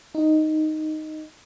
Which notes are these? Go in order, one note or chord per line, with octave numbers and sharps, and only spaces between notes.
D#4